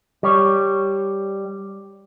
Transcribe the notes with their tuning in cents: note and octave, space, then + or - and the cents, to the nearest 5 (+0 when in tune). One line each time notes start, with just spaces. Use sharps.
G3 +0 C#5 +0